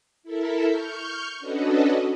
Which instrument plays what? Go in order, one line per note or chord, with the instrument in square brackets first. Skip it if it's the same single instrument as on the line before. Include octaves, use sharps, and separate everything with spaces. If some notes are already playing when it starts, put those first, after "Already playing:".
[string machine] E4 A4 A#4 E5
C#6 F6 G6
C#4 D4 F#4 A4 B4 D#5